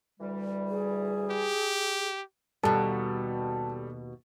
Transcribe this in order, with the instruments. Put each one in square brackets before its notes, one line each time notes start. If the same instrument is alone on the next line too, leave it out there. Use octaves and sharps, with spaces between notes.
[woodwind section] D2 E3 G3
[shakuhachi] G#4
[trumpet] G4
[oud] D#2 B2 [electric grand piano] G3 A4 [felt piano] A5